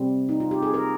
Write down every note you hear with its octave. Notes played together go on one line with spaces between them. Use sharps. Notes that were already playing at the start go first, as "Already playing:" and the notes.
Already playing: C3 G3 C4
D#4
F4
G4
G#4
A#4